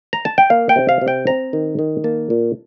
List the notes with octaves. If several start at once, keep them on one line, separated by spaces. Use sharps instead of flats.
A#5
A5
G5
A#3 F5
G5
C3
F5
C3
G5
C4 A#5
D#3
D#3
A#3 A5
A#2